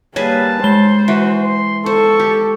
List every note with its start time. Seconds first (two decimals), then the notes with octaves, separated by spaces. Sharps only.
0.16 G3 A#3 G#4 B4 C#5 G#5 A5
0.64 G#3 C5 G7
1.08 E3 F#4
1.41 C6
1.86 A4 C5 C#6
2.20 G4